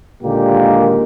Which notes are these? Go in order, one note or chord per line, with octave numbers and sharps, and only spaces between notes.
A#2 D3 D#3 G#3 A#3 G4